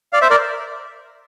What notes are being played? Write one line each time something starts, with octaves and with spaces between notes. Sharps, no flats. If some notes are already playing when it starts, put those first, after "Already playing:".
D5 F5
C5 E5
A#4 D5